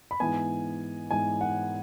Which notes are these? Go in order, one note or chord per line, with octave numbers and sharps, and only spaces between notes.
B5
G#2 E3 B3 G#5
G#2 E3 B3 G#5
F#5